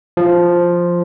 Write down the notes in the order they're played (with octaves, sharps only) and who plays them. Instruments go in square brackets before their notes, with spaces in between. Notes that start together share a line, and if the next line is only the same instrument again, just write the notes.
[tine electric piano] F3